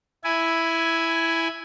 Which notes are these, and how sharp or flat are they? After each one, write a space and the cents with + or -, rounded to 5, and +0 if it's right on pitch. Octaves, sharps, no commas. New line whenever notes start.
E4 +0 G#5 +0